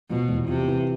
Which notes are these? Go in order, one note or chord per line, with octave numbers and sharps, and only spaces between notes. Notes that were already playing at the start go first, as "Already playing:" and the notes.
B2 F3
E2
C3 F4
E3